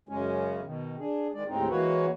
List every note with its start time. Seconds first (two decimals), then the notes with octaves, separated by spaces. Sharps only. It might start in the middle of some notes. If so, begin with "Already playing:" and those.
0.09 F#2 C#3 G#3 C#4
0.64 B2 D#3
0.99 D4 G#4
1.34 D#3 G#3 D5
1.48 D#2 A2 G#3 C4 D#4
1.70 E3 G#3 A#3 F#4 B4 C#5